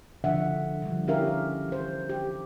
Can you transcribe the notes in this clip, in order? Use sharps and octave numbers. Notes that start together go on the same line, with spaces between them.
D3 F3 D4 E5 F#5
D3 F3 G3
C#4 E4 G4 A#4 E5 F5
E3 C5
G4